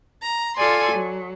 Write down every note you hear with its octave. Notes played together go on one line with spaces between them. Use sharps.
A#5
F4 A4 D5 G#5 C6
F#3